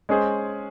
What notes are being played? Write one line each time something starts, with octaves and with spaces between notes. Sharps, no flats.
G#3 C#4 G#4 C5